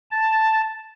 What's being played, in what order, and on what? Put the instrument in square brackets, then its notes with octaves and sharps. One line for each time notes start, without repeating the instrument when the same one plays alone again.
[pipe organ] A5